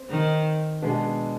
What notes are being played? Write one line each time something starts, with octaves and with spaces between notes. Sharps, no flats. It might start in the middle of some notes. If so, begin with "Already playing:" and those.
Already playing: C4 C5
D#3
B2 G#3 B3 D4